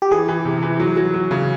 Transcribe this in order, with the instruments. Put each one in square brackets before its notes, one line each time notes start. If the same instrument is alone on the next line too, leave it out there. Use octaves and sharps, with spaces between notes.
[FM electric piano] G4
[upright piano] E3 [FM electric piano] G#4
[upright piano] E3
C3
E3
F#3
F#3
F#3
C#3